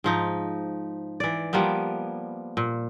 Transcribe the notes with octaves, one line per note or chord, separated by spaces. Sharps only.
G#2 F3 D#4
E3 D5
F3 G3 A#3 B3
A#2